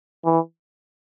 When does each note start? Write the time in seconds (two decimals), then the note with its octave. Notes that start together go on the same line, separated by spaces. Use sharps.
0.25 E3